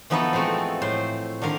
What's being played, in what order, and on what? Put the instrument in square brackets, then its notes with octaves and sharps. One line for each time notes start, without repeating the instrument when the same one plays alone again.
[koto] E3 F3 B3 D#4 F#4 A4
G#3 A3 C4 A4
A2 C5
D3 D#3 A#4 F5